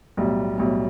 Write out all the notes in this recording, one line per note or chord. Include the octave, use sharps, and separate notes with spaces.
B1 A2 G3
B1 A2 G3